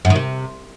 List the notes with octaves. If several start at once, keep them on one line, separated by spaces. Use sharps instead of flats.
F#2
D#3
C3